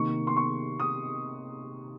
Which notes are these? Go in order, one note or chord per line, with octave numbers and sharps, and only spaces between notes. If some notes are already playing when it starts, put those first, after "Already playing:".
Already playing: C3 D#3 A#3 C#6
C6
C#6
D#6